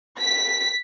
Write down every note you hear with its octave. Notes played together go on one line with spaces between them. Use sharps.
B6